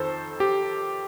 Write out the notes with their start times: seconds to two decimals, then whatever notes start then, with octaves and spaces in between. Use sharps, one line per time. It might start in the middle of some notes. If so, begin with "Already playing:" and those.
Already playing: F2 D#3 A4 C5
0.40 G4